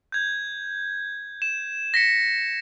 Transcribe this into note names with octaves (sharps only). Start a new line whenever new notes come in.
G6 G#6
E7
A#6 B6 C#7